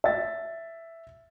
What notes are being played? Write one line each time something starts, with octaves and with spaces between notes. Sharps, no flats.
E5 A6